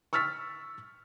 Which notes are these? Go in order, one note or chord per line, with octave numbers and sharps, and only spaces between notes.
C#6 E6 F6 A6 B6